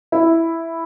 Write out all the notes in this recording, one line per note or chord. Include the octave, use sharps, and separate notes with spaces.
E4